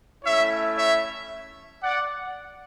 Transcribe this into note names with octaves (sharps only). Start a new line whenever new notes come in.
A3 C#4 E4 C#5 E5
C#5 E5
D5 F#5